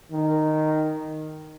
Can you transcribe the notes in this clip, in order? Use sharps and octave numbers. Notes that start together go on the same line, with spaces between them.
D#3